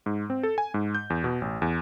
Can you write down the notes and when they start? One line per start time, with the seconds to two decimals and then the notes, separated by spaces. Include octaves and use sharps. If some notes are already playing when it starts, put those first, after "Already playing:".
0.06 G#2
0.30 C4
0.43 A4
0.58 G#5
0.74 G#2
0.95 G6
1.10 E2
1.24 B2
1.42 A1
1.62 E2